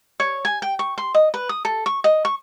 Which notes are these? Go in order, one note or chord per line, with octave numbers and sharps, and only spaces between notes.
C#5
G#5
G5
C#6
C6
D#5
B4
D#6
A4
C#6
D#5
C#6